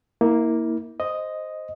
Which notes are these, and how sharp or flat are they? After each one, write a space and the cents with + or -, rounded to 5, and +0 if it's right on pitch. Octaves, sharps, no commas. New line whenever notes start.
A#3 +0 E4 -30
C5 +0 D#5 +0